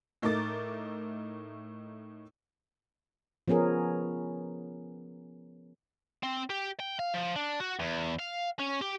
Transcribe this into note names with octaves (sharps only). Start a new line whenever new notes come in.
A2 A3 D#4 A#4 D6 A6
F3 B3 C#4 G#4 A#4
C4
G4
G5
F5
F3
D4
F#4
E2
F5
C#4
G4